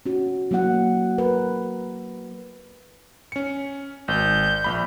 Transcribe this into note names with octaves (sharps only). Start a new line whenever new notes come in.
C#4 F#4
F#3 A#3 E4 F#4 F#5
A#4 B4
C#4 C#7
G#1 G6
A#1 B5